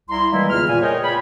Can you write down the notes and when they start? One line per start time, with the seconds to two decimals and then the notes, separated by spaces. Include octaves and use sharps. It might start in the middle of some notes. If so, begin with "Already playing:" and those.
0.09 C2 E4 A#5 C6
0.32 D#3 E3 G3 G#3 A#3 E4
0.50 E2 C#3 F4 F6
0.68 A#2 A#3 G#5
0.82 G#4 A#4 B4 C#5 D#5 G5
1.04 A#2 F4 G#5 B5